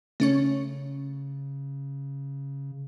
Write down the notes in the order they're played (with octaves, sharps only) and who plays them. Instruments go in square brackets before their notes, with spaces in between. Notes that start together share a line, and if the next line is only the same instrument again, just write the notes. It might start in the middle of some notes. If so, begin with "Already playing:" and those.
[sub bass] C#3 [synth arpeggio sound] A3 C#4 C#5